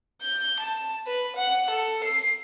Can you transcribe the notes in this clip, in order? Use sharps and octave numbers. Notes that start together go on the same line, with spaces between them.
G6
A5
B4
F#5
A4
C7